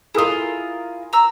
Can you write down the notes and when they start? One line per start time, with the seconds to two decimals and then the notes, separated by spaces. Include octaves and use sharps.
0.15 E4 F4 G#4 A#4 D#6
1.13 A#5 E6